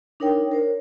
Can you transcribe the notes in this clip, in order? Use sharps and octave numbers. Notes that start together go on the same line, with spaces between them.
D4 D#4 A#4 C#5 G5
A#4 C5 C#5